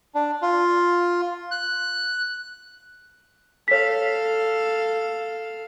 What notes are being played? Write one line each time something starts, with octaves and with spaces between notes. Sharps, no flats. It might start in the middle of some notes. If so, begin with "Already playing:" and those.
D4
F4
F#6
A4 C#5 F5 B6